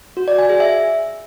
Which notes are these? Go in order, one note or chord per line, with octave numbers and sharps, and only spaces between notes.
F#4
D5
G#5
G#4
E5